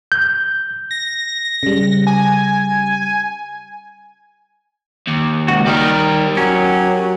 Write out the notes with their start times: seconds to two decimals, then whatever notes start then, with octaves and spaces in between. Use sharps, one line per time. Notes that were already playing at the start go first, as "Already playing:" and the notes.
0.12 G6
0.91 A#6
1.63 C#3 G3
2.07 G#5
5.08 D#2
5.48 C#2 F#4
5.67 D#3 G3 D#4 G4 A#4
6.37 F#3 C#4